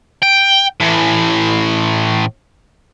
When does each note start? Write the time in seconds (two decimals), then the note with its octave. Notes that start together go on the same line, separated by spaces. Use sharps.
0.22 G5
0.80 A2 E3